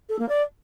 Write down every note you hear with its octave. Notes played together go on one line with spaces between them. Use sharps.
A4
A#3
D5